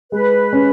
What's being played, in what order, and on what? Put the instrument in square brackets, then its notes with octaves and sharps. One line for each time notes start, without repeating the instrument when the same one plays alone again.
[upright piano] G#3 [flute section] B4
[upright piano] C#4